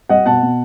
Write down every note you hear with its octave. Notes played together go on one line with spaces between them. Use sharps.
G3 D#5 F#5
B2 F#5 A5
B2